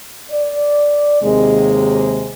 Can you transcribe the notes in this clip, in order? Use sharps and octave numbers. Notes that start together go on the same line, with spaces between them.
D5
D#2 C3 G#3